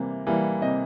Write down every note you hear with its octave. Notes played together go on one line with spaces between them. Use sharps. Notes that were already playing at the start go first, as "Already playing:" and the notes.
Already playing: C3 E3 G3 A#3
E3 G3 A#3
C3 D#5